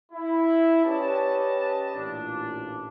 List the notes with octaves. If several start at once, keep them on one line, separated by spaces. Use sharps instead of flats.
E4
C#4 G4 B4 D5 D#5 A5
A1 A#2 D4